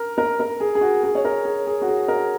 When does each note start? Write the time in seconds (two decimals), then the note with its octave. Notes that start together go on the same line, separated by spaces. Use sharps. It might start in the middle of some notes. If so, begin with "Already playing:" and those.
Already playing: A#4
0.18 A#4
0.40 A#4
0.60 G#4
0.75 G#4
0.81 F#4
1.03 G#4
1.15 C#5
1.25 A#4
1.45 G#4
1.67 G#4
1.82 F#4
1.88 G#4
2.08 A#4